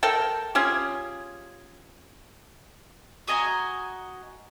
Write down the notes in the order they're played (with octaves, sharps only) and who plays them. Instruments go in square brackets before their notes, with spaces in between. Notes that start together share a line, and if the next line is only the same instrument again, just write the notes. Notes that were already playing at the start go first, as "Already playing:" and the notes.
[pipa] A4 A#4 G5
C#4 F4 G4 G#4
[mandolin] F#4 D#5 G#5 A#5